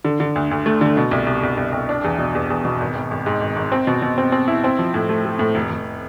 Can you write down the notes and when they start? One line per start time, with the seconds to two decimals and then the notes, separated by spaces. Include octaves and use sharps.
0.05 D3
0.20 D3
0.36 D2
0.51 D2
0.66 A3
0.81 D3
0.97 B2
1.11 C2
1.27 C2
1.43 C2
1.57 C2
1.72 C2
1.89 D4
2.04 E2
2.18 B2
2.35 E2
2.50 E2
2.65 B2
2.80 G#1
2.95 G#1
3.11 G#1
3.26 G#2
3.41 G#1
3.56 G#1
3.72 C4
3.87 B2
4.02 B2
4.18 C4
4.32 C4
4.48 E4
4.64 C4
4.79 F3
4.94 A2
5.09 A3
5.25 A3
5.39 A2
5.55 F1
5.71 F1